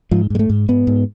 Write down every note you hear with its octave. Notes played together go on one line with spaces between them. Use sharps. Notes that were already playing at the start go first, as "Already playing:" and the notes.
G#2 F3
G#2 G#3
A3
G#2
G#2 B3
G#2